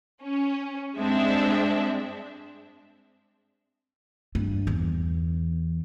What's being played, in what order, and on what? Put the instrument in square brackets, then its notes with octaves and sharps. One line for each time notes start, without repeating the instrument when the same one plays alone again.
[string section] C#4
G2 G#3 C4 D4 E5
[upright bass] G2
E2